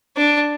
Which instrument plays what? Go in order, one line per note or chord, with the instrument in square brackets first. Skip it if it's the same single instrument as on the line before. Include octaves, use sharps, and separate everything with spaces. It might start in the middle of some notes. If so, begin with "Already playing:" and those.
[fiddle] D4